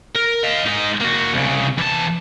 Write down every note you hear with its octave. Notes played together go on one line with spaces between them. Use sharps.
A#4
D#5 F5
G#3 D#4
A#3 F#4
C2 C#3
E2 A5